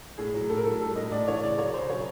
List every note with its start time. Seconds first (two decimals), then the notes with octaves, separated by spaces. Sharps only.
0.18 A2 G#4
0.34 F#3
0.49 A2 A4
0.57 A#4
0.64 F#3 A4
0.81 G3 A4
0.96 A2 D#5
1.11 A2 D5
1.28 E3 C#5
1.42 C#3 D5
1.58 F#3 C#5
1.74 C#3 C5
1.89 F#3 C#5